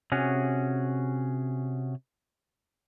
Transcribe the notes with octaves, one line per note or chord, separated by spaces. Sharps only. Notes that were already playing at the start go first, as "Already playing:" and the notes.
C3 C#4 F#4 G#4